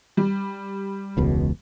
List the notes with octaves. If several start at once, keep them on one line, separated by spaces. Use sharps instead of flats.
G3
E1 C#2 B2